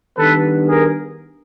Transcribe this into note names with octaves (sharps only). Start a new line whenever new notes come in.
D#3 G3 B3 D4 A4 B4
G#4 A#4